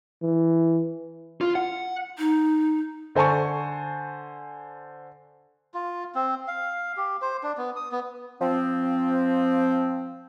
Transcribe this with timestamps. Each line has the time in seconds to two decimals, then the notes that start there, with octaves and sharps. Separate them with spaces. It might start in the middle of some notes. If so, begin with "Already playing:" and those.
0.22 E3
1.41 F4
1.55 F#5
2.17 D#4
3.15 D3 C5 G#5 A5 C#6
5.74 F4
6.15 C4
6.48 F5
6.97 G4
7.22 C5
7.43 D4
7.58 B3
7.76 D#6
7.92 B3
8.41 F3 C4